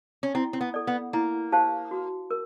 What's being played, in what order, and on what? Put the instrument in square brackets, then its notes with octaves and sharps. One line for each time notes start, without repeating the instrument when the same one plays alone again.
[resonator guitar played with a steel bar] C#4
[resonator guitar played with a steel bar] C4 [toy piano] E4
[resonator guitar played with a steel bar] C4
B3
[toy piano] A4 D5
[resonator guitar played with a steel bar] B3
[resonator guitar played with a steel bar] A#3 [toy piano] E4
[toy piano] G4 C5 F5 A5
F#4
A#4